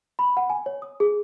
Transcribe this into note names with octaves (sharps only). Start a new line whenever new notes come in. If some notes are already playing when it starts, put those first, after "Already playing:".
B5
F#5
G#5
C#5
D#6
G#4